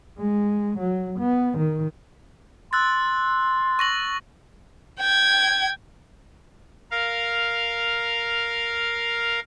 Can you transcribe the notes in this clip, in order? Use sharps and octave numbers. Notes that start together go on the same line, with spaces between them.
G#3
F#3
B3
D#3
C6 E6 F#6 A6
C#6 A#6 F#7
G5 G#6
A#4 F5